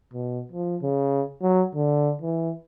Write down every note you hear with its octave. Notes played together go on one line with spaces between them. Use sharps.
B2
F3
C#3
F#3
D3
E3